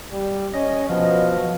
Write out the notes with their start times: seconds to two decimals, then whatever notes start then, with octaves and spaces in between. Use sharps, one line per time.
0.11 G3
0.53 C#4 D#5
0.89 B2 F3